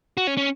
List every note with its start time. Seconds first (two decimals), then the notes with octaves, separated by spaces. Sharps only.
0.17 F#4
0.27 C#4
0.37 C#4